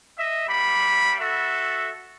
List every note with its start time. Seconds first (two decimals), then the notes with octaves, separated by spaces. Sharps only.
0.19 D#5 E5
0.48 G3 A#3 B5
1.20 F#4 A4 E5